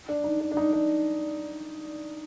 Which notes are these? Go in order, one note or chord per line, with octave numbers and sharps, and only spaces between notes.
D4
D#4
D4
D4
D#4
D4